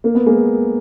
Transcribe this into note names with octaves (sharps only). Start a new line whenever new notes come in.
A#3
B3
G#3 A#3